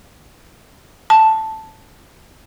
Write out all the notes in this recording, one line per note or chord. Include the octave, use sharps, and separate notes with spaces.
A5